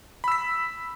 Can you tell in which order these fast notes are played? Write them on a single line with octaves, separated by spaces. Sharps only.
B5 E6 B6